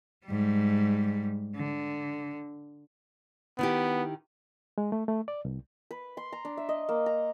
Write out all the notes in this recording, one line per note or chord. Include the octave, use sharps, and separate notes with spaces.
G#2 G3
D3
D#3 B3 E4 G4
G#3
A3
A3
D5
C2
B4
C6
A#5
D4
E5
D#5
A#3
A#5